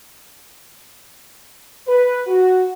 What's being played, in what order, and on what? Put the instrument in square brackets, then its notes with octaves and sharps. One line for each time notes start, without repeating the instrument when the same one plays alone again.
[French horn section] B4
F#4